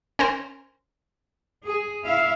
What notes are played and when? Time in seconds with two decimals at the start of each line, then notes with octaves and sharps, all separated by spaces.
0.19 C#4 A#4 C5
1.65 G#4
2.04 E4 E5 F5